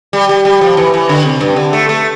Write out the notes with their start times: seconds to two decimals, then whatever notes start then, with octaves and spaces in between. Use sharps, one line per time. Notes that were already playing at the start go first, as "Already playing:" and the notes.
0.13 G3
0.29 G3
0.45 G3
0.61 F3
0.77 E3
0.94 E3
1.09 D3
1.25 C3
1.41 G2
1.56 D3
1.73 A3
1.89 A3